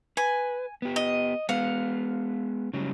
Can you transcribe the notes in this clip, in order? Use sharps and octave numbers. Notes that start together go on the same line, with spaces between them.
B4 G#5
B3 G4
D#5
G#3 B3 F5 F#5
C#3 F#3 G3